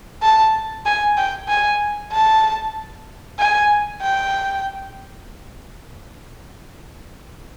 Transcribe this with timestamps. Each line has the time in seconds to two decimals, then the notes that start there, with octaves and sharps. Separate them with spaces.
0.23 A5
0.86 G#5
1.17 G5
1.49 G#5
2.12 A5
3.39 G#5
4.02 G5